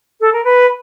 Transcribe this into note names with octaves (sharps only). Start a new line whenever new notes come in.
A4
A#4
B4